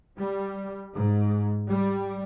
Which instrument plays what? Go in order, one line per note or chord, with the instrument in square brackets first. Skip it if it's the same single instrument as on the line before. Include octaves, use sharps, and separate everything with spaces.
[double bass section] G3
G#2
G3